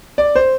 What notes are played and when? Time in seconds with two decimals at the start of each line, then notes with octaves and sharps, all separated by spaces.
0.18 D5
0.36 C5